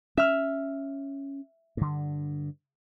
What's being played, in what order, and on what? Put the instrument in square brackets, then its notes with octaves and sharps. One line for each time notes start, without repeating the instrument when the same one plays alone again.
[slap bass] C#4 [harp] E5 F6
[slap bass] G2 D3